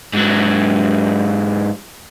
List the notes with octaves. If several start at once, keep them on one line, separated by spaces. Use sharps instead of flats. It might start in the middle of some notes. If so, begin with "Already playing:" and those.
G#2 F#3